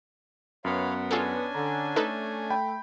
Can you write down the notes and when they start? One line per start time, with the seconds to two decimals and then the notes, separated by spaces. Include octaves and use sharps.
0.65 F#2 B3 C#5 F5 B5
1.11 C#4 D4 F4 G#4 A4 G#5
1.55 D3 A#5
1.96 A3 D#4 A4 B4
2.50 G5 B5